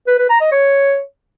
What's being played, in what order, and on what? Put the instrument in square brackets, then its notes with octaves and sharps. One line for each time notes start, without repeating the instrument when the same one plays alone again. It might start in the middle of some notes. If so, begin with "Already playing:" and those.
[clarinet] B4
B4
A#5
D#5
C#5